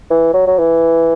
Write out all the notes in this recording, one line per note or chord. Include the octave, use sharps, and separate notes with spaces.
E3
F#3
F#3
E3